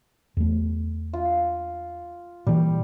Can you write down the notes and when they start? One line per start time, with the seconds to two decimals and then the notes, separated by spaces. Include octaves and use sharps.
0.37 E2 A3
1.13 F4
2.47 A#2 E3 G3